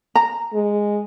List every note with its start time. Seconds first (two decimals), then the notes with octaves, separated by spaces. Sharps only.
0.15 A#5
0.54 G#3